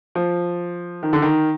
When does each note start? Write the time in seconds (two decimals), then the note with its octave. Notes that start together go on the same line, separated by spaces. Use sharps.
0.15 F3
1.03 D#3
1.13 D3
1.22 D#3